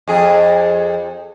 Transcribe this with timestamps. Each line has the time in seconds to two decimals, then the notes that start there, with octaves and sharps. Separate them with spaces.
0.08 F2 G#4